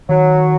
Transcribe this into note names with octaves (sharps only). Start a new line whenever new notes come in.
D#3 F#3